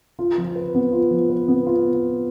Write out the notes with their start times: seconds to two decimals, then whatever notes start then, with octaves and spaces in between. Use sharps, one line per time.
0.19 F4
0.38 F3
0.56 B4
0.75 B3
0.93 F4
1.11 F3
1.30 B4
1.48 B3
1.66 F4